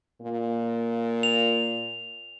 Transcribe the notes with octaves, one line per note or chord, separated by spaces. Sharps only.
A#2
F7